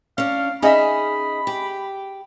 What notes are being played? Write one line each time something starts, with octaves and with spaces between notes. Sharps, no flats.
C#4 D4 F5
C#4 D#4 G#4 D#5 E5 B5
G4